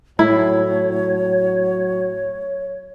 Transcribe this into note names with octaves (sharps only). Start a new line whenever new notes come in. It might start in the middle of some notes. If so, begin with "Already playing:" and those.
A2 F#3 E4 C#5